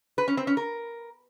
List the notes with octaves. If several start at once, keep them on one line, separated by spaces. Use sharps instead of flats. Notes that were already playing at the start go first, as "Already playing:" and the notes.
B4
C#4
C4
C#4
A#4